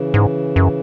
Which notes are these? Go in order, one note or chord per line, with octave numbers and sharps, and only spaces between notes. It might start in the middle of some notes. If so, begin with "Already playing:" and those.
Already playing: C#3 E3
G#2
F#2